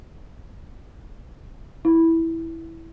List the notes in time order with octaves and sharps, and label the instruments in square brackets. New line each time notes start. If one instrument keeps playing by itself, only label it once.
[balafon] E4